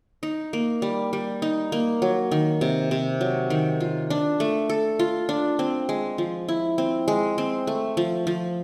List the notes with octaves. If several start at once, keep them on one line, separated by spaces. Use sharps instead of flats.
D#4
A#3
G3
G3
D#4
A#3
F#3
D#3
C3
C3
F#3
D#3
F4
D4
A3
A4
F4
D4
C4
G#3
F3
E4
C4
G#3
C4
A3
F3
F3